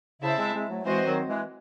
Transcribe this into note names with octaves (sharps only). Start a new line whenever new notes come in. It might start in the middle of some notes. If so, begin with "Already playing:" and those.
C#3 E4 C5 E5 A5
G#3 C4
G#3 C4
F#3 A3
E3 G#3 C4 F#4 C5 D#5
D#3 F#3
E3 G#3